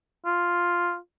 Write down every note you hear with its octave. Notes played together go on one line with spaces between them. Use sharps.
F4